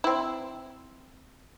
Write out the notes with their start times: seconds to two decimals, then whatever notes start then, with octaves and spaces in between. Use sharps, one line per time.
0.04 C4 E4